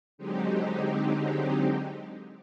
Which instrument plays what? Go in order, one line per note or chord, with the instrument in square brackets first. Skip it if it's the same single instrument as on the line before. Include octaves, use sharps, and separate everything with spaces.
[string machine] D3 F#3 G#3 C4 D#4 G4